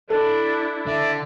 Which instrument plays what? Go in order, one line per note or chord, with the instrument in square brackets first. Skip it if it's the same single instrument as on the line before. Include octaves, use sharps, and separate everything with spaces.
[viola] D4 E4 [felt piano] A4
[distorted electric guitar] D3 [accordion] D5 E5